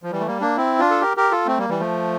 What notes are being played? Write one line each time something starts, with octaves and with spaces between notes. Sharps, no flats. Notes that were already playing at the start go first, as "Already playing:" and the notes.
F3
E3 G3
A3
G3 A#3
A#3 D4
C4 E4
D4 F4
A4
G4 A#4
G4 A#4
F4 A4
A3 C4
G3 A#3
E3 G3
F3 A3